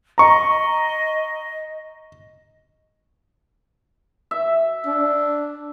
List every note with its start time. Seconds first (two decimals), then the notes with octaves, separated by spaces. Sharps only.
0.18 D#5 A#5 C#6
4.31 E5
4.86 D4